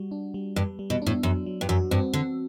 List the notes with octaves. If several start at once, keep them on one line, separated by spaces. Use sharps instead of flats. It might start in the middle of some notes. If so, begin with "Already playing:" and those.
Already playing: G3 F#4
D4
G3
G2 G3
G3
B2
A2 D4
F#2 F#3
F#3
G2
F#2 F#4
G2 C4
D3 C4